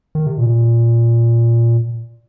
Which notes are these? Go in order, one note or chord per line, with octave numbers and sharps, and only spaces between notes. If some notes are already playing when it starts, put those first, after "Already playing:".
D#3
C3
A#2